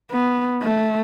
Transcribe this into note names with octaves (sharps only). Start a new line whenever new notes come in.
B3
A3